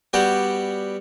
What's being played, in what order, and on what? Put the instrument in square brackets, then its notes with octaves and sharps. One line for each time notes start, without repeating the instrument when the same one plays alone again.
[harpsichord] G3 B3 F#4 D5 F#5 G5